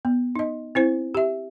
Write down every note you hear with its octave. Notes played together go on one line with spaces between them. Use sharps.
B3
D#4 D#5
C4 E4 C5
G4 E5